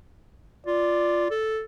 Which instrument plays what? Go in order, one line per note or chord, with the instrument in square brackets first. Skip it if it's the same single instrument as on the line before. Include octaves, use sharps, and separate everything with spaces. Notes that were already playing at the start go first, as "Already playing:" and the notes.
[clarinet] F4 [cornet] D5
[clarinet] A4